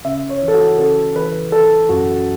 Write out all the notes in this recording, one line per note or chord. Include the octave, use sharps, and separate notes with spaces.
C#3 E5
C#5
E3
A4
F#4
C#3 A4
E3 B4
E3 A4
F#2 F#4